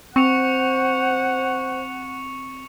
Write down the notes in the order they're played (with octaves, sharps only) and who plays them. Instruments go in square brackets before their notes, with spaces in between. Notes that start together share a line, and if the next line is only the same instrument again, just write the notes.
[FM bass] C4 [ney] C5 [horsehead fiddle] F#5 [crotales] C#6 C#7 F7